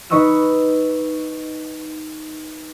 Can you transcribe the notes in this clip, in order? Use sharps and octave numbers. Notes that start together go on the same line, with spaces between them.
D#4 B4 D#5 C#6 E6 E7